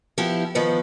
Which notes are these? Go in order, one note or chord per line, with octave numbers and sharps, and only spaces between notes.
F3 B3 E4 G4
D#3 F3 B3 B4 C5